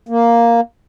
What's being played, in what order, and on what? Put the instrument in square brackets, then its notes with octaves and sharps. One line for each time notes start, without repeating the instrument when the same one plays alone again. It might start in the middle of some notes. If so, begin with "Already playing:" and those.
[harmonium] A#3